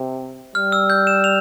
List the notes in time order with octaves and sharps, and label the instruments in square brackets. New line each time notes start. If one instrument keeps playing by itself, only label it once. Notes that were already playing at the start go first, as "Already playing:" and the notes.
Already playing: [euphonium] C3
[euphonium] G3 [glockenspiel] F6
[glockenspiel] E6
G6
E7
F7